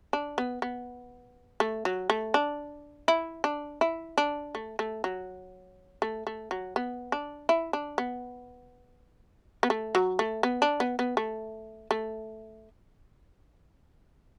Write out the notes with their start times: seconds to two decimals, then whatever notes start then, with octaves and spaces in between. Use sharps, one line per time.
0.13 D4
0.38 B3
0.62 B3
1.60 A3
1.85 F#3
2.10 A3
2.34 D4
3.08 E4
3.44 D4
3.81 E4
4.18 D4
4.55 A3
4.79 A3
5.04 F#3
6.02 A3
6.27 A3
6.51 F#3
6.76 B3
7.12 D4
7.49 E4
7.73 D4
7.98 B3
9.63 B3
9.70 A3
9.95 F#3
10.19 A3
10.43 B3
10.62 D4
10.80 B3
10.99 B3
11.17 A3
11.91 A3